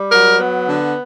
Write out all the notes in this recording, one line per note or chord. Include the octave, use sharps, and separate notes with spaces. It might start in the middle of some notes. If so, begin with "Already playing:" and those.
Already playing: G3
F#3 A#4
B3
D3